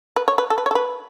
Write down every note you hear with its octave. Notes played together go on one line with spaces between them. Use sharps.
B4
C#5
B4
A4
B4
C#5
A4
B4